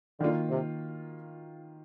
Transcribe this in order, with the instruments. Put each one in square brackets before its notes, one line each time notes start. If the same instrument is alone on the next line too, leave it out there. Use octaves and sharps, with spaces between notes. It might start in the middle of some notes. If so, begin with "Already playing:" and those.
[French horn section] D3 [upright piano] D#3 A#3 F4
[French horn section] C3